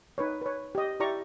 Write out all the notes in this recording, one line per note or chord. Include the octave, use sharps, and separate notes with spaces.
D#4 B4 C#5
B4 C#5
G4 D#5
E4 G4 D5 A#5 C#6